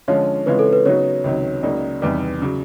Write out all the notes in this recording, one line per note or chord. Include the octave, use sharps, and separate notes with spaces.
D3 F3 G#3 C#4 F4 C#5
C#3 E3 G#3 C4 F4 B4
A4
B4
C#3 F#3 B3 D#4 F#4 C#5
C#2 C3 D#3 F#3
C#2 C#3 F#3 A#3 D#4 D5
E2 C3 D#3 G3 B3
C#3 F#3